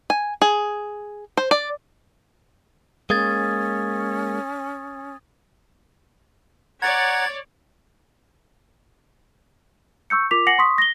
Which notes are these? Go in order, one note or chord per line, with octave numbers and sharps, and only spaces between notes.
G#5
G#4
C5
D5
G#3 A#3 C#4 D#6 G#6 A6
C#5 D5 F#5 A#5 G#6 A6
C#6 E6 G6 C#7
F4 A#4 D6 B6 F7
F#5 G#5 A#6 C7 C#7 F#7
C6 C#6 D#6 B6
A#6 G7